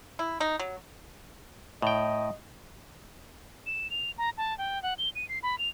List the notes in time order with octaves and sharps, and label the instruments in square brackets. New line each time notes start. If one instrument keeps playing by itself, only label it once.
[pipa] E4
D#4
F#3
[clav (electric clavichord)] A2 G5 [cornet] D#5
[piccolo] E7
F7
A#5
A5
G5
F#5
G7
D#7
C7
B5
F7